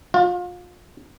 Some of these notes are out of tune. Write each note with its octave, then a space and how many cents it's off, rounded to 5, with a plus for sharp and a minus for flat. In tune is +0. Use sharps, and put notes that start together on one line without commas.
F4 +30